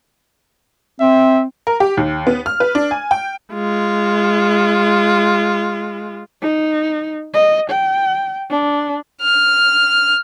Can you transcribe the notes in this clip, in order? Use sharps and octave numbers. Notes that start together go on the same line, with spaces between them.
C4 E5
A#4
G4
D#2
B3
F6
B4
D4
G#5
G5
G#3 F4
D#4
D#5
G5
D4
F6